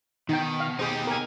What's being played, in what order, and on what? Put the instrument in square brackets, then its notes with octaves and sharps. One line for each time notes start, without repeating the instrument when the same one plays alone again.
[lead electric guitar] B2 [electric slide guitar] D#3 [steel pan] D#4 G5
[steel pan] F5
[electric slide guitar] D#4 G4 [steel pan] G#4 C5
[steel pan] A#4 G#5